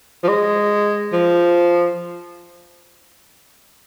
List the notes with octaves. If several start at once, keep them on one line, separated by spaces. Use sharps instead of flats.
F3
G#3
F3